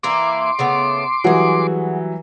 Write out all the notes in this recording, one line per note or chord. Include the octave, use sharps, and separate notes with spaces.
E3 A#3 E4 C6 D6
C#3 A3 B3
E3 F#3 G3 F#4 G#4